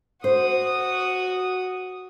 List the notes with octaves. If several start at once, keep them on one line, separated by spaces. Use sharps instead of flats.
F#4 C5 D#6